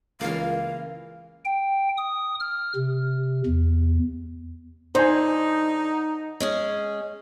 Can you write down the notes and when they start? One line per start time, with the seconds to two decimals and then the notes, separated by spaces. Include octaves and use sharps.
0.21 C#2 E3 A#3 F5
1.45 G5
1.97 D#6
2.40 F6
2.75 C3
3.46 E2
4.95 D3 D#4 C5 G#5
6.40 G#3 C#4 G#4